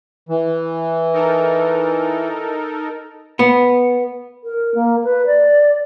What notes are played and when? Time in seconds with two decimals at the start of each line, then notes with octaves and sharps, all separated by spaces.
0.29 E3
1.14 D#4 A4 A#4
3.39 B3
4.44 A#4
4.75 A#3
5.04 B4
5.26 D5